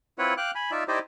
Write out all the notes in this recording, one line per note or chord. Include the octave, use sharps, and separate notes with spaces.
C4 E4 F4 B4 C#5 F#5
F5 G5 D6 F#6
G#5 B5
D#4 F4 D5 E5
D#4 E4 G4 C5 D5 D#5